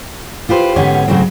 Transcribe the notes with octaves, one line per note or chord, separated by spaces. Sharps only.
F4 G4 B4 C5
G#2 D3 B3 C#4 G4 C#5
G#2 C#3 F#3 A3 C4